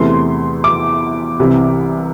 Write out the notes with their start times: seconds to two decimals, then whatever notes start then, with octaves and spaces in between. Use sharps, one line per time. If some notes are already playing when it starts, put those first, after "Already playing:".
Already playing: E2 C3 E3 A3 C6
0.64 D6
1.39 C2 C3 E3